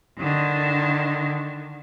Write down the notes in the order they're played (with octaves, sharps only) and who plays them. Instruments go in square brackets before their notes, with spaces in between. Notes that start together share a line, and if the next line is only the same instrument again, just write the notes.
[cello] D3 D#3